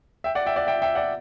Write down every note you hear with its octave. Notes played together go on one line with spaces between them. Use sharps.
E5 G5
D5 F#5
E5 G5
D5 F#5
E5 G5
E5 G5
D5 F#5